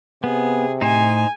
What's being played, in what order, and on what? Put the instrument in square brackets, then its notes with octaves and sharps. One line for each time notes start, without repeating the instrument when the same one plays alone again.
[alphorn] C3 [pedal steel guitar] B3 [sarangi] G#4
[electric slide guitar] A2 [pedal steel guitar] D#4 C5 [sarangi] G#5